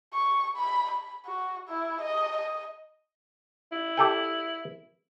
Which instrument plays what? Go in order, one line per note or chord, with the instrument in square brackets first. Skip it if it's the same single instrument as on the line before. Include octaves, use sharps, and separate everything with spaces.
[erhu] C#6
B5
B5
F#4
E4
D#5
D#5
[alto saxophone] E4
[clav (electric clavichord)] G4 A4 G5